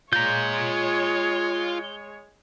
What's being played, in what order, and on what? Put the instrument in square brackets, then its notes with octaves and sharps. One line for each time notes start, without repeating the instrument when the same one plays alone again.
[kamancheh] G#3 C#5 [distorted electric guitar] F4 A#5 [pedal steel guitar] G6